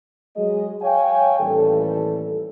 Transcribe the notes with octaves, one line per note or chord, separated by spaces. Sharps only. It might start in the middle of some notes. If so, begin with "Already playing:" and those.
F#3 G#3 G#4 D#5
C#5 F5 G5 G#5
A1 D#2 E3 G3 A4